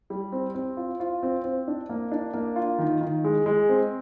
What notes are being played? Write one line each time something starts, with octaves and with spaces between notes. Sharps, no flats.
G3
C4
C4
F4
F4
C4
C4
D4
A#3
D4
A#3
F4
D#3
D#3
G#3
G#3
C4